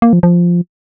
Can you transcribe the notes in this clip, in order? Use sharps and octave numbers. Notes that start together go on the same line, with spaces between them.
A#3
F3
F3